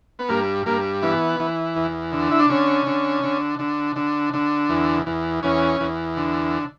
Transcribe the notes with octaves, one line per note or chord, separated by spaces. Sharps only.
B3
G2 A#3
G2 A#3
E3 B3
E3
E2
D3
E4
D4
D3 C#4
D3
D3
D3
D3
D3
E2
E2
E2 C#4
E2
D3